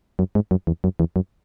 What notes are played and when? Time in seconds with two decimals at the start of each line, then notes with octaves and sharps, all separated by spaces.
0.19 F#2
0.35 G#2
0.51 F#2
0.67 E2
0.84 F#2
1.00 E2
1.16 F#2